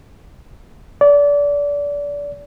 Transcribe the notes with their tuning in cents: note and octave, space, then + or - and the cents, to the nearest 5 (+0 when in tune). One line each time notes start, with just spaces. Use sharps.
D5 -25